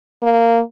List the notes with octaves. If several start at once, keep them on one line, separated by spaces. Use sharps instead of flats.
A#3